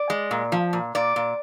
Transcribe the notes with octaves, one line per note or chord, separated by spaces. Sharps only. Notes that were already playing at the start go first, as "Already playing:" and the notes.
Already playing: D5
G#3
A#2
F3
A#2
A#2 D5
A#2